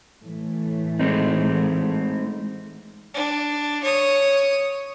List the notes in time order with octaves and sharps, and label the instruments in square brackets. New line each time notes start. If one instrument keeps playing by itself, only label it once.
[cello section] A2 E3 A3
[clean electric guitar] G#3 C4 D#4
[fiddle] D4
C#5 D#6